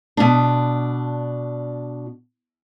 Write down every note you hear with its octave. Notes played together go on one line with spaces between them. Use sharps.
B2 D4